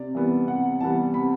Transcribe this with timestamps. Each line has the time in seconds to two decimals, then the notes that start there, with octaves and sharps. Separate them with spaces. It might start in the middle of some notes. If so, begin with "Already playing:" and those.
Already playing: C3 D5
0.15 E3 G3 B3
0.48 C3 F#5
0.81 E3 G3 B3 A5
1.14 C3 B5